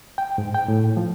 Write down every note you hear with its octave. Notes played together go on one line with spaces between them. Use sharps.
G5
G#2
G5
A2
F3